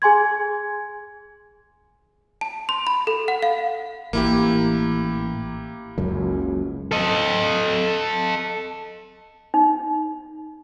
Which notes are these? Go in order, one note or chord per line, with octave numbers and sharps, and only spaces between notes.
G#4 G#5 C6 G#6
A5
C6
B5
A4
F#5
F5
A1 A#3 E4 G4
F#1 C#2 F#2
A4 D#5
D#4